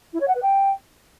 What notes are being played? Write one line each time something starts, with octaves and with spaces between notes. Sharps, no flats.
E4
C#5
F#5
B4
G5